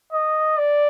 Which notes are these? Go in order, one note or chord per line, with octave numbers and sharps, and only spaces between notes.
D#5
D5